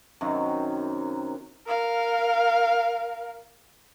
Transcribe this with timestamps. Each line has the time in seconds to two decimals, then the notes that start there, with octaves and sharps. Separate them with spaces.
0.21 F#2 C3 D#3
1.67 A#4 F5